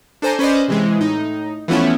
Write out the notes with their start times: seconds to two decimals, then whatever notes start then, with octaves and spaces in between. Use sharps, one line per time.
0.22 D4 A4 C5 G#5 A#5
0.39 C#4 B4 C5 D5 D#5
0.68 C3 E3 G#3
0.98 A2 D#4
1.68 E3 F3 A3 B3 C#4 E4